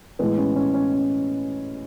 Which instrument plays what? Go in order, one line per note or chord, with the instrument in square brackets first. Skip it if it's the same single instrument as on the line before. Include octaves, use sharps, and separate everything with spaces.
[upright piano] A2 E3 G#3 B3
C#4
C#4
C#4
C#4